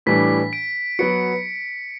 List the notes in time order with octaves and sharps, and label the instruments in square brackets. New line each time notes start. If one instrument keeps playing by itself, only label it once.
[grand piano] A2 E3 G3 D4 [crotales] B6
[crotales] D7
[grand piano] F#3 B3 F#4 [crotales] C#7